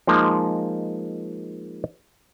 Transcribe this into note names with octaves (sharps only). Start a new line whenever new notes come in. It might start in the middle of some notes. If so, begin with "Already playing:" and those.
F3 G#3 A#3 D#4